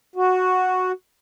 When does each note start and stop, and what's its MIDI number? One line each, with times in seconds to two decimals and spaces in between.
0.16 0.92 66